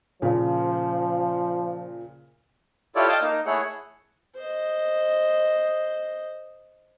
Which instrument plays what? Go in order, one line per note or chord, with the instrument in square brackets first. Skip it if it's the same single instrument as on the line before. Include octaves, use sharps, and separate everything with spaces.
[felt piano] A#2 C#3 [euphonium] F3
[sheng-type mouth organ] E4 F4 G4 A4 C#5 D5
D#5 F5 G5 A5
A#3 D#4
A3 E4 G#4 A4 C#5 F#5
[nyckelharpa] C5 D#5